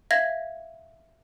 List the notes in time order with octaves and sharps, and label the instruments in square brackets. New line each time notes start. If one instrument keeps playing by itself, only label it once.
[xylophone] E5 F5 G#6 A#6